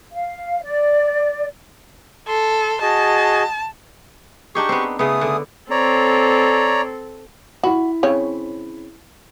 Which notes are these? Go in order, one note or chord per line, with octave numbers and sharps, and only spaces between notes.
F5
D5
A4 C6
F#4 G#4 D#5 A5
D4 D#4 G4 G#4 C#6
B3 C4
C#3 A3 B3 G#4 D#6
D3
C4 A4 C#5 D5 A#5
E4 F#4 B5
C#3 C4 C#5